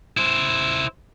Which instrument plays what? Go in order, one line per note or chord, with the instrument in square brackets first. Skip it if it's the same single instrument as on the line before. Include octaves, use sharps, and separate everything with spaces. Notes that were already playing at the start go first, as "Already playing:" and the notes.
[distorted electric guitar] E4 C5